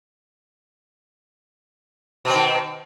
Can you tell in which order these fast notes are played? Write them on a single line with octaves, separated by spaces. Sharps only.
B2 C4 D#3